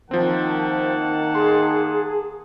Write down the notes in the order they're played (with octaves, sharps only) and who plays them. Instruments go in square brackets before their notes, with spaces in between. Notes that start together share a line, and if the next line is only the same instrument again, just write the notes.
[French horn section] D#3 [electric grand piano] F3 C4 [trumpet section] A#3 F#5 A5
[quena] G#4 [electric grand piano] C6